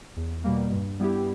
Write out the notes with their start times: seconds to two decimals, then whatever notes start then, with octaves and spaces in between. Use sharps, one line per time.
0.17 E2
0.44 B2 G3 A#3
0.72 G2
0.99 G3 B3 E4 G4